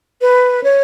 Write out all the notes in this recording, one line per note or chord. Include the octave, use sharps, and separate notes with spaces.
B4
C#5